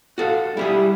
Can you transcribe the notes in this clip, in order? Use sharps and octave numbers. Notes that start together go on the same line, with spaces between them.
F#4 A4 F5
G3 E4 G4 G#4